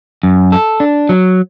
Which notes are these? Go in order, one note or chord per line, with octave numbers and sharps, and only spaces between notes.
F#2
A4
D4
F#3